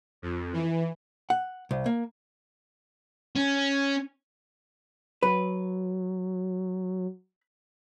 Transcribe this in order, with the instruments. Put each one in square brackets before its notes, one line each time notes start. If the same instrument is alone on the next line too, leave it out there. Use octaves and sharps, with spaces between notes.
[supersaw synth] F2
E3
[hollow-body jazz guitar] F#5
C2
A#3
[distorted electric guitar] C#4
[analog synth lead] F#3 [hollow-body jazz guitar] B4